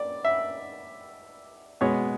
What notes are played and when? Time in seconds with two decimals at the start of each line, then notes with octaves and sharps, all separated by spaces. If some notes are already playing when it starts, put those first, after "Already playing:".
Already playing: D5
0.25 E5
1.81 B2 G#3 B3 C#5